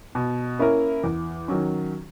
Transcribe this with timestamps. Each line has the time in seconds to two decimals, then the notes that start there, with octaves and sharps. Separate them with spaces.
0.15 B2
0.59 A#3 C#4 E4 A#4
1.04 E2
1.48 D#3 F#3 C#4